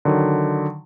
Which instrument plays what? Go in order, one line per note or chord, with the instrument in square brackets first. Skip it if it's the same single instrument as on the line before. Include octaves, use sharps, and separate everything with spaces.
[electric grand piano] D3 D#3 F#3